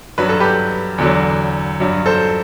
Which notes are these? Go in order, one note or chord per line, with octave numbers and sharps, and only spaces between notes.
G2 F#3 B4
A4
G4 B4
E2 D3 F#3
G2 F#3
A4 C5